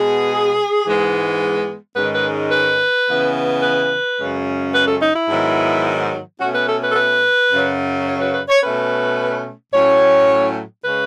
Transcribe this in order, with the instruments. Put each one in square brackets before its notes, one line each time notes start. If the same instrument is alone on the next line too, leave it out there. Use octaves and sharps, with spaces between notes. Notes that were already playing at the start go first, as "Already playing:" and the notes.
Already playing: [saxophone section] B2 G#3 B3 G#4
G#2 E3 G#3 B3
G#2 D#3 G#3 C#4 B4
B4
B4
C#3 E3 B3
B4
F#2 C#3 G#3 C#4
B4
A4
D#4
E4
G#2 D#3 F#3 B3
B2 A3 C#4 F#4
B4
A4
B4
A4
B4
F#2 C#3 F#3
C#5
B4
B4
C#5
B2 A3 C#4 B4
A2 F#3 A3 C#4 C#5
C#3 G#3 C#4 B4